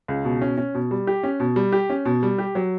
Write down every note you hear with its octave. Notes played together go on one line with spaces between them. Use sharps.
C#2
B2
C#4
C#4
B2
G3
G4
C#4
B2
G3
G4
C#4
B2
G3
G4
F#3